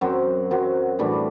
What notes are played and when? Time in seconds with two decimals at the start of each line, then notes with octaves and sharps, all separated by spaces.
0.01 F#2 F#3 C4
0.51 F#2 F#3 C4
0.99 A2 E3 G3 D4